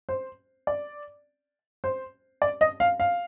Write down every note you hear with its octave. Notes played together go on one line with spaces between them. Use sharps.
C5
D5
C5
D5
D#5
F5
F5